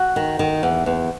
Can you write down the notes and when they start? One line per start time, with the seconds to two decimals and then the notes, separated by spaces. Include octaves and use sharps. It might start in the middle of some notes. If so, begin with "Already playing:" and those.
Already playing: F#4
0.16 D#3
0.39 D#3
0.63 E2
0.86 E2